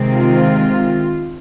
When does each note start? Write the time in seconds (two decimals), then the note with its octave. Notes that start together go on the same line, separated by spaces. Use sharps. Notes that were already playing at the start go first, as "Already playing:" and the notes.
Already playing: C3 D#3 G#3 C4
0.12 F4